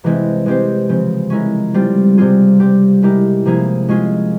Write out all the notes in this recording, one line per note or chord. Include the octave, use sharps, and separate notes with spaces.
C3 E3 G#3 C4 E4
G#3 C4 G4 C5
C#3 F3 C4
G#3 C#4 E4 A#4
G3 C4 F4
C3 G3 C4 F4 G#4
G3 C4 G4
G#3 E4 G4 A#4
C3 F3 A#3 E4 G#4
G#3 C#4 F4 G#4